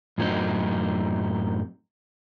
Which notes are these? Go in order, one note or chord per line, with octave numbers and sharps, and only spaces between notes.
F#2 A2 F#3 C4 D#4